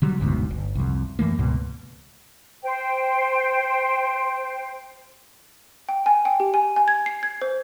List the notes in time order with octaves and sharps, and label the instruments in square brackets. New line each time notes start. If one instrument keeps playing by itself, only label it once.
[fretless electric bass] D3 F#3 G3
F#1 D2 G#2 B2
G1
C2 F2
F#2 E3 A3 A#3
C#2 G#2 B2
[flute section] C5 G5
[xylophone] G5
G#5
G5
G4
G#5
G#5
G#6
C7
G#6
C5